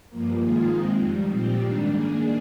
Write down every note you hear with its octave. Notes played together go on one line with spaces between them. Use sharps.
G2 F3 A#3
G#2 D#3 A#3 F4 G#4
D#3 G#3 C4
F2 D#3 G3
A#2 F3 C4 G4
G#2 D#3 G3 D4
D#3 A#3 D4 G#4